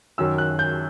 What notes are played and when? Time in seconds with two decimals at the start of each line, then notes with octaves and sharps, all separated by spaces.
0.18 F#2 D#3 E6
0.38 F#6
0.59 G6